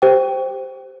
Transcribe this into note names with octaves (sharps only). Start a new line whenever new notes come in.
G4 C5 G5